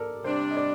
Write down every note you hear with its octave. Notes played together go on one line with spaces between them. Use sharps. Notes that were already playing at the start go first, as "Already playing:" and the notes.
Already playing: A4 A#4 D5
C3 G3 D4 C5
D#5
D5